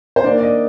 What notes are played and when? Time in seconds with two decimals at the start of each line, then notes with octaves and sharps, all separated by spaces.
0.16 C5
0.24 D#3 A#3 D4 D5
0.39 D5
0.43 D#5